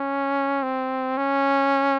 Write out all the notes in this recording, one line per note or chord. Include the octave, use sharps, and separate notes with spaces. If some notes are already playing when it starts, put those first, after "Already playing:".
Already playing: C#4
C4
C#4